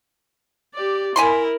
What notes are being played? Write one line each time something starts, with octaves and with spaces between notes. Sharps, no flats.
G4 D5
E4 A#4 G#5 B5 C6